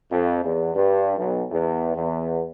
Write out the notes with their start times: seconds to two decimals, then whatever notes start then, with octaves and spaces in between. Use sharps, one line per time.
0.10 F2
0.44 E2
0.74 G2
1.16 B1
1.51 E2
1.95 E2